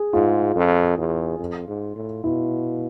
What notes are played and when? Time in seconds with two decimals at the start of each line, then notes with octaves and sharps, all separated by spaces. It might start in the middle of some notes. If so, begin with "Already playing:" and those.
Already playing: G#4
0.13 G#2 F4
0.56 F2
0.97 E2
1.39 F2
1.68 G#2
1.96 A2
2.24 B2 E4